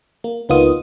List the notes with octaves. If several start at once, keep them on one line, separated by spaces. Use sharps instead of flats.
A#3
C#2 A#3 B3 D#4 F4 D#6